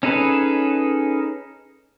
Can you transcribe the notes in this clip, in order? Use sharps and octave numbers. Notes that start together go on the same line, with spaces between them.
C#4 D#4 G#4 A4 B4